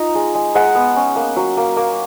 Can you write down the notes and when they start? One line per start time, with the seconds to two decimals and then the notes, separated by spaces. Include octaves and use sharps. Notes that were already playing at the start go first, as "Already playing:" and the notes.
Already playing: D#4 F4 A#5
0.15 G#3
0.35 G#3
0.55 G#3 F#5
0.75 B3
0.96 C#4
1.16 A#3
1.36 F#3
1.57 A#3
1.77 A#3